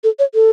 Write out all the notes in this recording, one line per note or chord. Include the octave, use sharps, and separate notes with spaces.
A4
C#5
A4